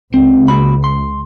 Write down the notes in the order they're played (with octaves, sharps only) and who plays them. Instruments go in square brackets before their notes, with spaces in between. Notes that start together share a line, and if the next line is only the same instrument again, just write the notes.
[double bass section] C#2 [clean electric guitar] C4
[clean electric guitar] A#3 F#4 B5
C6